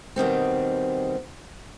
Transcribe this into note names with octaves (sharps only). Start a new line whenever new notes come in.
B2 D#3 G3 C4